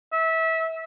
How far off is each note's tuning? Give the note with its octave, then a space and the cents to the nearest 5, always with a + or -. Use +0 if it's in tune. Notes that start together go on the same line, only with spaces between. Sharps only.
E5 -25